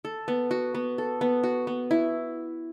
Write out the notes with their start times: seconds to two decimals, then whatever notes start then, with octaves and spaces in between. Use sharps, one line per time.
0.05 A4
0.28 B3
0.51 F#4
0.75 B3
0.98 A4
1.21 B3
1.43 F#4
1.67 B3
1.91 E4